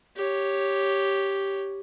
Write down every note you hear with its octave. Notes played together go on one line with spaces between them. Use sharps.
G4 C#5